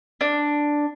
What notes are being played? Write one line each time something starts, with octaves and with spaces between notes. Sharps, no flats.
D4